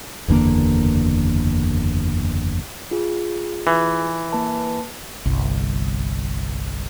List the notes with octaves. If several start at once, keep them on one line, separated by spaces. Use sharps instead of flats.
F#1 E2 D3 A#3
F4 G#4
E3
A#3 B4 A5
G1 C2